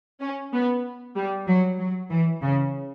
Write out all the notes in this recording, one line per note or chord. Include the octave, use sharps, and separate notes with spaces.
C#4
B3
G3
F#3
F#3
E3
C#3